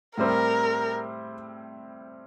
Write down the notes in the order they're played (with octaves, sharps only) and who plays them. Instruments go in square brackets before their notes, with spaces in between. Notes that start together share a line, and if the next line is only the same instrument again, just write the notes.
[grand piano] A2 G3 C4 [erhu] A#4